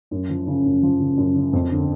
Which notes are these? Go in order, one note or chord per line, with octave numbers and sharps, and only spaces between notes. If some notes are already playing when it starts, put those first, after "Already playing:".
F#2
F3
C#3
F#2
F3
C#3
F#2
C#3
F2
D3